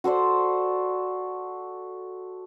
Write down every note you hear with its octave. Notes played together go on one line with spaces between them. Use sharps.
F#4 A4 C5 D5